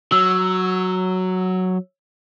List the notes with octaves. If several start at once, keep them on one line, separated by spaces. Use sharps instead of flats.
F#3 E6